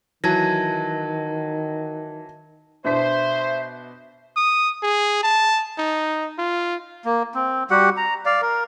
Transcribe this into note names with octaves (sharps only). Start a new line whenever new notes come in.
D#3 E3 F#3 A5 G#6 A#6
B2 D4 C5 E5 B6
D#6
G#4
A5
D#4
F4
A#3
C4
G3 F#4 G4 F#5
A#5
D5 F5
A#4